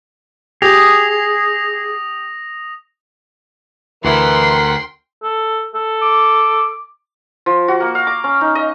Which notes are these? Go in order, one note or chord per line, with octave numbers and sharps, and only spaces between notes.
G4 G#4 D#6 A#6 F7
D2 E3 A#4 F#5 G5 C6 B6
A4
A4
D6
F3
F#4
A#3
F5
D6
C#4
D#4
D#5